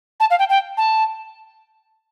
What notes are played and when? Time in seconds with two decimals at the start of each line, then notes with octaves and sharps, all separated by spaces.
0.20 A5
0.30 F5
0.39 G5
0.49 G5
0.77 A5